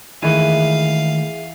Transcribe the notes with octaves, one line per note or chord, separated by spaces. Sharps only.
D#3 E3 G#3 A3 G#4 E5 F5 D#7